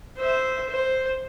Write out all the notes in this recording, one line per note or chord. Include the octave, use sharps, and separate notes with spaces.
C5 E5
C5